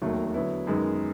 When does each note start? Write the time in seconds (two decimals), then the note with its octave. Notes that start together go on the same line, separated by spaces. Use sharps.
0.02 E1 D#2 D#3 F#3 A3
0.34 D3 F#3 B3 E4
0.67 F#2 D#3 G#3 B3 D#4